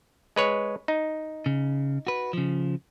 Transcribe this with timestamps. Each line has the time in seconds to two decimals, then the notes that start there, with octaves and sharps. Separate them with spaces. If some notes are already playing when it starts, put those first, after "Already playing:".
0.36 G#3 B4 C#5
0.88 D#4
1.46 C#3
2.07 F#4 B4
2.33 C#3 F3